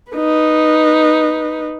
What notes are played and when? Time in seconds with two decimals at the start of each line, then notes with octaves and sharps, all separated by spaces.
0.12 D#4 B4